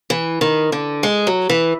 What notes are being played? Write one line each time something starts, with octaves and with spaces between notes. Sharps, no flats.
E3
D#3
D3
G#3
F#3
E3